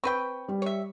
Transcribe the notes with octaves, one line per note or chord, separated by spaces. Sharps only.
C4 B4 G5 C#6
G3
C#5 E5